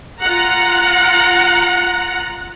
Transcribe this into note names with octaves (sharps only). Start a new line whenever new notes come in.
F4 F#5 A#5